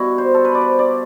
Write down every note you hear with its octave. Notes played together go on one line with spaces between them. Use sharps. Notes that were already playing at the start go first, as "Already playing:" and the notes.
Already playing: B2 G3 B3 E4 F#4
C5
A4
B4
D5
C5
D5